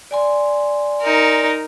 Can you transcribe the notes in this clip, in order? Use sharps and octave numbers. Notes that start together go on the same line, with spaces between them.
D5 G#5 C6
D#4 A#4